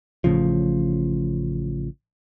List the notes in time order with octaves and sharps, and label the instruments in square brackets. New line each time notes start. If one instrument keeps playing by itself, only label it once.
[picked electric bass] A1 A2 C#3 F3